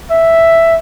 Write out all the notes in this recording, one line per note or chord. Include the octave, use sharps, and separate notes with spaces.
E5